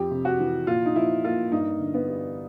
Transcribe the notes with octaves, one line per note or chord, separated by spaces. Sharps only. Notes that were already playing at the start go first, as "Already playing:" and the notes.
Already playing: F2 G4
C3
F#4
E3
A#2 F4
D#4
F3 E4
A#3 F4
G2 D#4
D3
B3
G3